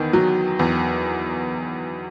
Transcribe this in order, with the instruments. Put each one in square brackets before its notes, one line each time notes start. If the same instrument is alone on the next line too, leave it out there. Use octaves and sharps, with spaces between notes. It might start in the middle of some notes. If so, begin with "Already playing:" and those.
Already playing: [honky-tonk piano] E2 D#3
F#3
E2